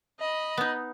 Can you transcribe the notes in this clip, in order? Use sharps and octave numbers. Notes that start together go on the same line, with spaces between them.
D#5 B5
B3 D#4